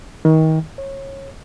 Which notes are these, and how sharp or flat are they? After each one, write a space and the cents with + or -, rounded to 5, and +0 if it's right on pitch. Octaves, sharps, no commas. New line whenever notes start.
D#3 +30
C#5 -25